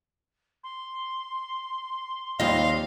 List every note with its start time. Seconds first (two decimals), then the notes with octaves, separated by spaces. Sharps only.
0.64 C6
2.40 D#2 F3 G3 C4 D#5 F5